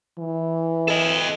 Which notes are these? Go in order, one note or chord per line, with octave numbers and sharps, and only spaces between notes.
E3
A4 D#5